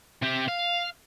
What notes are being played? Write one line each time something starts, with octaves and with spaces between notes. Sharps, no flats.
C3 G4
F5